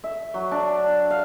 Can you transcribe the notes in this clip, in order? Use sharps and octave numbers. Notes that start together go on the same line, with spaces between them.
E5
F#3
D4
F5